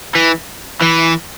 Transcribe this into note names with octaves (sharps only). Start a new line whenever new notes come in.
E3
E3